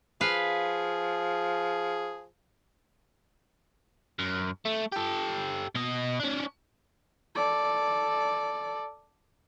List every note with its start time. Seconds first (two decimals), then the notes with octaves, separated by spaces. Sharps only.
0.21 F3 G#4 B4 F5
4.19 F#2
4.66 A3
4.92 G4 A4
5.75 B2 D#5
6.20 C#4 D4
7.35 A4 D5